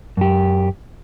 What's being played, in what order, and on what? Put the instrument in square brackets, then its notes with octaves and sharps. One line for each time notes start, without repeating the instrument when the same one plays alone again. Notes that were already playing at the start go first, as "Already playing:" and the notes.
[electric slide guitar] F#2 G4